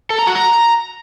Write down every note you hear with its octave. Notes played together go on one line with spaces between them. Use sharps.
A4
A#5
F#4
A#5